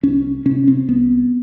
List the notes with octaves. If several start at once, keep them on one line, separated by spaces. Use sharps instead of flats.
C2 C#4
C3 C#4
C4
C2 B3